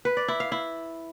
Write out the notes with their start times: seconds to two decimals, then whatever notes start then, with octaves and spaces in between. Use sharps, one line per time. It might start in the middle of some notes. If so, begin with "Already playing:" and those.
0.05 B4
0.17 D5
0.28 E4
0.40 F5
0.52 E4